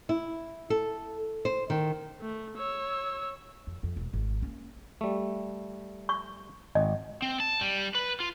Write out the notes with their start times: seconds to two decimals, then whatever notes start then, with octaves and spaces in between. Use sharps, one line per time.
0.09 E4
0.70 A4
1.45 C5
1.70 D#3
2.21 A3
2.57 C#5 E6
3.67 F2
3.83 F2
3.96 E1
4.13 G#1
4.42 A#3 C#4
5.01 G3 A3
6.09 C#6
6.75 G#1 D#5
7.22 C4
7.40 A5
7.61 G3
7.95 B4
8.20 F4